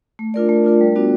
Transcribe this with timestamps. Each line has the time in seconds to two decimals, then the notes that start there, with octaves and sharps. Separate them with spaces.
0.19 A3
0.34 D4 F4 A#4 D5
0.49 A3
0.64 D4 F4 A#4 D5
0.81 G3
0.96 B3 D4 F#4